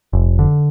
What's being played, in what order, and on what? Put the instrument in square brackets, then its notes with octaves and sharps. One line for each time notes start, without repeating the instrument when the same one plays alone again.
[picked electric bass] F1
D3